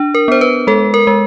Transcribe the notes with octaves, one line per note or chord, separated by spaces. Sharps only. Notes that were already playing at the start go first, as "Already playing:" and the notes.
Already playing: D4
A#4
B3 C5
B4
G#3 A4
A#4
G#3